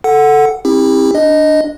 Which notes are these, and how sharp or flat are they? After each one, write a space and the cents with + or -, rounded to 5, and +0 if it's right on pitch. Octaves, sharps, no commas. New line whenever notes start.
A4 +0 F#5 +0
C4 +30 E4 -20 G4 +35
D4 +0 D#5 +0